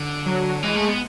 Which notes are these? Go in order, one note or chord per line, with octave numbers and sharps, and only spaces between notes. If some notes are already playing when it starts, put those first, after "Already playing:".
Already playing: D3
F#3
E3 G#3
A3
B3